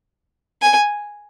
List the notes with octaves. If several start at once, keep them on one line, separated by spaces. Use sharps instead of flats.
G#5